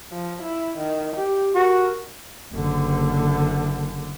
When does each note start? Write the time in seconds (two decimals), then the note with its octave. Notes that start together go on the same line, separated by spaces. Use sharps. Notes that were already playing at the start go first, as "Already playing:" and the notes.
0.12 F3
0.42 E4
0.78 D#3
1.16 G4
1.55 F#4 A#4
2.53 F#1 D3